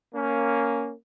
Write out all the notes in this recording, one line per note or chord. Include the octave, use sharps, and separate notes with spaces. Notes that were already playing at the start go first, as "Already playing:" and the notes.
A#3 C#4